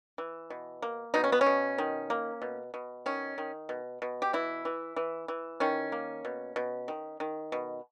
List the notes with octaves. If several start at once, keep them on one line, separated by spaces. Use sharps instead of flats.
E3
B2
A#3
B2 D#4
C#4
B3
C#4
B2
D#3
A#3
B2
B2
D#3 C#4
D#3
B2
B2
G4
E3 E4
E3
E3
E3
D#3 C#4
A#3
B2
B2
D#3
D#3
B2